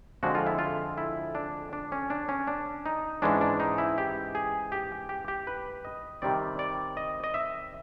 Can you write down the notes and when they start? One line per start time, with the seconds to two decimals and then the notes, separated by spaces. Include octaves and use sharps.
0.23 F2 D3 F3 G#3 F#4
0.35 F4
0.47 E4
0.59 F4
0.98 E4
1.35 D4
1.73 D4
1.92 C#4
2.10 D4
2.29 C#4
2.47 D4
2.86 D#4
3.22 G#2 E3 G#3 C#4 D4
3.41 D4
3.60 D#4
3.78 E4
3.98 G4
4.35 G#4
4.72 G4
5.09 G4
5.28 G4
5.47 B4
5.85 D#5
6.22 C3 D#3 G3 C4 D5
6.59 D5
6.97 D#5
7.24 D#5
7.34 E5